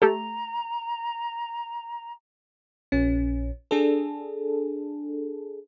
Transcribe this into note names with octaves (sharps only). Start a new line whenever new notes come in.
A3 G4 A4 A#5
A#1 C#4
D4 G#4 A4